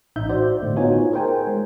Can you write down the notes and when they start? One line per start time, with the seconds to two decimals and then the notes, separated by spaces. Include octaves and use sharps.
0.16 A1 D#4 E5 G6
0.29 F#4 C5 D5
0.62 A2 D3 A3
0.76 B3 D#4 F4 F#4 C#5 G#5
1.12 G#4 A#4 C5 G5 G#5
1.47 G#3